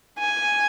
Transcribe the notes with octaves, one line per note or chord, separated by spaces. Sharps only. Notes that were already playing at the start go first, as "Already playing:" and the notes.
G#5